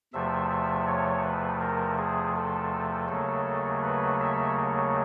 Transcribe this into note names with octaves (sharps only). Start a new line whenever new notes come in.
E2 C3 F3 A3 E5
E5
C#5
B4
A#4
G#4
A4
D#2 C#3 F#3 A3
B4
E5